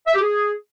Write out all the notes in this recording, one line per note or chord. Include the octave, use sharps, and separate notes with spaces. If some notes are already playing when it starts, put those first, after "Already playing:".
E5
G4
G#4